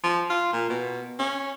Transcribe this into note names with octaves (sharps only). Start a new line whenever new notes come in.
F3
F4
A#2
B2
C#4